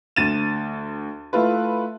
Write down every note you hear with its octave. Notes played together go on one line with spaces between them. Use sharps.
D2 A6 D#7 E7
A3 E4 F4 B4